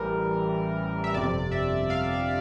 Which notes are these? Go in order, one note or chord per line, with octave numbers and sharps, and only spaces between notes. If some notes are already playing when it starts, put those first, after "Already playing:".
Already playing: A1 A2 E3 G3 A#4
E5
G1 F2 C3 D5
E5
F5